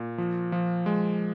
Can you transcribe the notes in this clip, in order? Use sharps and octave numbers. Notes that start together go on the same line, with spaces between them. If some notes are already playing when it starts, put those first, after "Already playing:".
Already playing: A#2
F3
F3
G#3